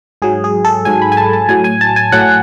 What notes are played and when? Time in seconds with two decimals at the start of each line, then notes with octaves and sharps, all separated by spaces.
0.22 G#2 F#3 G#4
0.44 G#4
0.65 A4
0.85 G#2 F#3 G#5
1.02 B5
1.12 G#5
1.17 A5
1.33 A5
1.49 A2 F#3 G#5
1.64 G#5
1.81 A5
1.96 G#5
2.12 A2 F#3 F#5